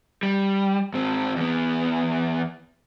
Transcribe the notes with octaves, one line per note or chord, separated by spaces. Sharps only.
G3
G#2 C4
E2 B3